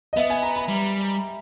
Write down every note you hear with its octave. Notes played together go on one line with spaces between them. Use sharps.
D#5
B3 E5
G#5
A#5
B5
G3